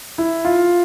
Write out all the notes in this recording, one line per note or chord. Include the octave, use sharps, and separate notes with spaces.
E4
F4